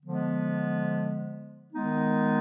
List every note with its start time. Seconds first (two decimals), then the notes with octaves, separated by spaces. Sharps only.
0.01 D3 F3 G#3 B3
1.73 D#3 G#3 B3 D#4